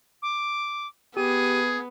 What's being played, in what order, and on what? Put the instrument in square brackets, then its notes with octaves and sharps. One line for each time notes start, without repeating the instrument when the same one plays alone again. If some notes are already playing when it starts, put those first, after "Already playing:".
[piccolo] D6
[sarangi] B3 [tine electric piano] G4 [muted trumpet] G#4 [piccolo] D#7